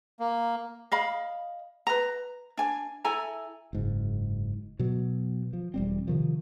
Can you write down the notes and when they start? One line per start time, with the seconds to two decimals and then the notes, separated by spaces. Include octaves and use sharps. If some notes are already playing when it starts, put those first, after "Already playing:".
0.20 A#3
0.92 D#5 F5 B5
1.87 B4 A#5
2.57 D4 G#5
3.04 E4 A4 G#5 A#5
3.73 F#1 G#2
4.79 B2 F#3
5.53 F3
5.74 E1 G3 C4
6.08 C3 D#3 F3